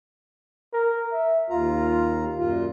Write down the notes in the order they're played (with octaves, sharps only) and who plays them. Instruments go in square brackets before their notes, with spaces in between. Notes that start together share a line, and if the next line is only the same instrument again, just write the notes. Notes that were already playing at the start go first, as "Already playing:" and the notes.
[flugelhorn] A#4
E5
[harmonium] D#2 A#5 [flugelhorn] F4
[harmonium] F#2 A#2 F4